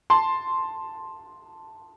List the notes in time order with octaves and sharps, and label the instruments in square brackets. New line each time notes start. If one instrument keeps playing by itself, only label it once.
[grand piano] A5 C6